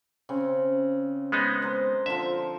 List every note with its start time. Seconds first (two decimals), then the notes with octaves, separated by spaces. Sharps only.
0.29 C#3 C4
1.32 G#3 B3 D#4
1.62 A#4 C5
2.06 D3 F3 E5